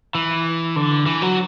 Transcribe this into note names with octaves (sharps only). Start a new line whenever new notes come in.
E3
D3
E3
F#3